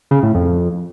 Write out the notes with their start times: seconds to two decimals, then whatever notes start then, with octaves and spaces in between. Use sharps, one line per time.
0.11 C#3
0.23 A2
0.35 F2